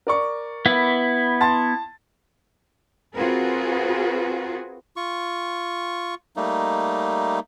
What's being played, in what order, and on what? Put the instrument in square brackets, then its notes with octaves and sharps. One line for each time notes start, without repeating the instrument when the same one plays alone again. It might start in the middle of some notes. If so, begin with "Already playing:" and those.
[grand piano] A#4 D5 C#6
[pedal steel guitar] B3 E4
[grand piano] A5 C6 A6
[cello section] C4 F4 F#4 G#4 A#4 B4
[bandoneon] F4 C#6
G3 A3 A#3 D#4